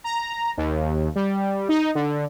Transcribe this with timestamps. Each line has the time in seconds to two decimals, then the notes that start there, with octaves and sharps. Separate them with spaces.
0.04 A#5
0.57 D#2
1.16 G3
1.69 D#4
1.95 D3